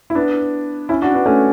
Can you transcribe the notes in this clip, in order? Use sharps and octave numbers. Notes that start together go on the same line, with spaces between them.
E4
B3 D4
C#4 E4
D4 F#4
B3 D4
A3 C#4